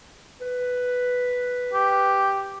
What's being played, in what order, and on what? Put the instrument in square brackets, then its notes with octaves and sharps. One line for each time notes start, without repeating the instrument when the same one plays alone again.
[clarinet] B4
[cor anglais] G4